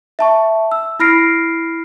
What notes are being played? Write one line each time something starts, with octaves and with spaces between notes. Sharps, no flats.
E5 A5 C#6
E6
E4 B5 F6 A#6 C7 D7